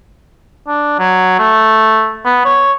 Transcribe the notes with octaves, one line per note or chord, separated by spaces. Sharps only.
D4
F#3
A3
B3
C#5